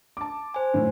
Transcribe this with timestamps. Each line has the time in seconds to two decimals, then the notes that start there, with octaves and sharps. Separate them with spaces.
0.17 A5 D6
0.54 C5 G#5
0.74 F#2 A2 D#3